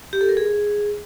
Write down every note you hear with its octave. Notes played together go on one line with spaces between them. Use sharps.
G4
A4
A#4
G#4